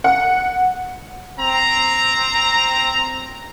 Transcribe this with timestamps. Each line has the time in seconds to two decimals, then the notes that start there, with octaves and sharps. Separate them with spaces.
0.04 F#5
1.38 C4 A#5